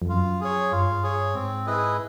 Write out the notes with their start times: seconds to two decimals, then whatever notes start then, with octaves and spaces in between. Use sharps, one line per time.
0.02 F2
0.09 F#2 F4
0.41 G#4 C#5
0.71 G2 F4
1.03 G#4 C#5
1.34 G#2 C4
1.66 E4 G#4 B4 D#5